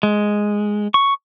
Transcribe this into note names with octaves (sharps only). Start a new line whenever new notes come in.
G#3
C#6